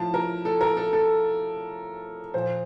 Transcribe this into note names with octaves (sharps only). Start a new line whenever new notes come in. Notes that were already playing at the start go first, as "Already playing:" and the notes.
Already playing: A2 F3 A5
A#4
A4
A#4
A4
A4
A#2 F3 C5